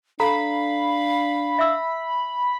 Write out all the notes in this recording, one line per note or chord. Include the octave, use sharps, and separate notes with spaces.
D4 A4 F5 A#5 B5
E5 E6